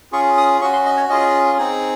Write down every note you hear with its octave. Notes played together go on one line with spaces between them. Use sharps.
C#4 F4 G#4 C#6
D#6
C#4 F#4 C#6
C6
D#5
C#5
C#4 F4 G#4 D#5
C4 D#4 G#4